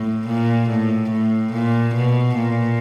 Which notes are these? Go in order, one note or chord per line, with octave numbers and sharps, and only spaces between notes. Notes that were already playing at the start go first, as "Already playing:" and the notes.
Already playing: A2
A#2
A2
A2
A#2
B2
A#2